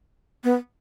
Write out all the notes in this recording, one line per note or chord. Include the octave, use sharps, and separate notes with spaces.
B3